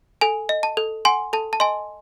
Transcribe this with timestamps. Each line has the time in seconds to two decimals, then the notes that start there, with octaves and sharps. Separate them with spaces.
0.21 A4 G#5
0.49 D#5
0.63 A5
0.77 A4
1.05 F#5 G#5 C6
1.33 A4 A5
1.53 A5
1.60 D#5 G#5 C6